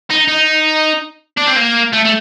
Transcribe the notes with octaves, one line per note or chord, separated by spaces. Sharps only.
D#4
D#4
D4
C4
A#3
A3
A3